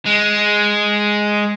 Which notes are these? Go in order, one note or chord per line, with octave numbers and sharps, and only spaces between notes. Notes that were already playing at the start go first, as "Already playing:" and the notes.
G#3